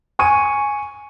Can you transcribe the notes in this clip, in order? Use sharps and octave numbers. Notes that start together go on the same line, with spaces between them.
G#5 C#6 D#7